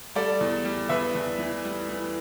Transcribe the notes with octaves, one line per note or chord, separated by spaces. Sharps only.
G3 A4 D5
E2
G3
E2 B4 E5
E2
E3
G3
E3